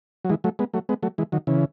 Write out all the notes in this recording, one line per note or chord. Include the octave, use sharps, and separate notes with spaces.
F#3
E3 G#3
F#3 A3
G#3 B3
F#3 A3
G#3 B3
F#3 A3
E3 G#3
D#3 F#3
C#3 E3